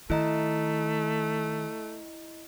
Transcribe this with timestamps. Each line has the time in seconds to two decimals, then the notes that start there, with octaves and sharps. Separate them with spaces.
0.10 D#3 A3 E4 D#5 A#5